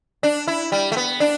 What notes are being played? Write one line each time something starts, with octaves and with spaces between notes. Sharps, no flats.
D4
E4
G3
A3
B3
D4